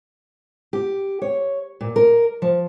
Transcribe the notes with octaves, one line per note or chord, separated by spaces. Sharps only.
G4
C#5
A#2
A#4
F3